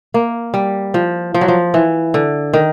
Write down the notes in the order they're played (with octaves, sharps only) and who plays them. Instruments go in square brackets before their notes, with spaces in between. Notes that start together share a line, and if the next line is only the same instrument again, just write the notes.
[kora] A#3
G3
F3
F3
F#3
F3
E3
D3
D#3